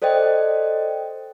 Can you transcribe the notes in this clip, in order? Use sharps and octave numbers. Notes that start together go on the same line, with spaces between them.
A4 C5 D5 D#5 G5